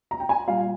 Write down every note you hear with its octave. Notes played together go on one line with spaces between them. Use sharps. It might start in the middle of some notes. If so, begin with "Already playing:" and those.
A#5
G5
G#5
A#2 G3 F5